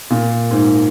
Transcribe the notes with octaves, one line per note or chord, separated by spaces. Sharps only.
A#2
G#2